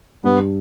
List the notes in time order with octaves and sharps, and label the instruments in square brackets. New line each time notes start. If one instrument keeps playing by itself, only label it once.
[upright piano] G2 [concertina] B3